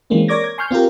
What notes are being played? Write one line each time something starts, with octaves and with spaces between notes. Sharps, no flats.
E3 G#3 A#3 C4 C#4
A#4 C#5 D5 D6 G#6 A#6
G#6
G#5 C6 C#6 F6 G6
C4 F4 G4 A#4